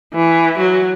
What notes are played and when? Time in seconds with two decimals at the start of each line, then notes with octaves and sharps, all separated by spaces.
0.14 E3
0.59 F#3